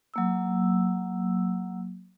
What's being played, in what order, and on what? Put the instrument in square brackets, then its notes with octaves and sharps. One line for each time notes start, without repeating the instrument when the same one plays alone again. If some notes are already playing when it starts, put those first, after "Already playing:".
[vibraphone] F#3 A#3 E6